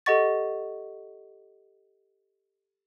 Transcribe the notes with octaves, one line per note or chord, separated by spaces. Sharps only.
G4 A4 D#5 F#5 C#6 A6